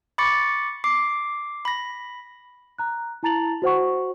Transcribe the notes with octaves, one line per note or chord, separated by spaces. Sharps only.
B5 C#6 D6 A6 C#7
D6 C7
B5 A#6
A#5 F#6
E4 A5 A#5 A6 F7 F#7
F#4 C5 F#5 C#6